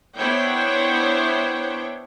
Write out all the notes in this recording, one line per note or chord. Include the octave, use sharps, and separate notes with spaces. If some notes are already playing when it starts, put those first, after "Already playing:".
B3 D4 E4 C5 C#5 G5